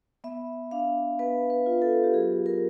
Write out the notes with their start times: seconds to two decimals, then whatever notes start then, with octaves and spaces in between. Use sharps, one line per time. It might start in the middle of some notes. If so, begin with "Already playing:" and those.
0.24 B3 E5
0.71 D4 F5
1.19 B3 B4
1.50 B4
1.66 F4
1.82 A4
2.04 G4
2.14 F#3 G#4
2.46 A#4